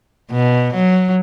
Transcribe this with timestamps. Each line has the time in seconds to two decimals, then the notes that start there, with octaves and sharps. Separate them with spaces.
0.32 B2
0.74 F#3